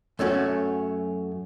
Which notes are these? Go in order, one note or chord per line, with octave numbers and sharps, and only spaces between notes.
F#2 A3 C#4 F#4